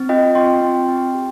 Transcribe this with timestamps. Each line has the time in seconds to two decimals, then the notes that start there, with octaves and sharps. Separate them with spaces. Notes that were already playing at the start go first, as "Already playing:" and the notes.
Already playing: C4
0.09 F4 D#5 G5
0.35 C4 G5 C6
0.61 C4
0.88 C4
1.14 G4